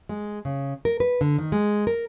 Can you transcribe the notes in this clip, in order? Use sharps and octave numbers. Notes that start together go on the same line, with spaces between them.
G#3
C#3
A#4
B4
D3
D#3
G#3
A#4